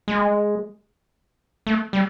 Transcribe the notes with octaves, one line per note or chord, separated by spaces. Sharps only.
G#3
A3
G3